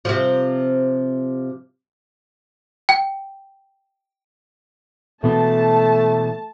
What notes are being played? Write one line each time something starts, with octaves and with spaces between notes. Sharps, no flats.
C3 F3
G5
B2 E3 A3 B3 A5